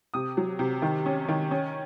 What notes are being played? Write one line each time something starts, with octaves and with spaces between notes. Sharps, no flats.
C3 D#6
F#3
C3
D#3
C#4
D#3
C#4